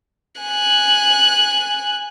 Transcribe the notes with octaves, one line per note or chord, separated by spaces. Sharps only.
G#5 F#6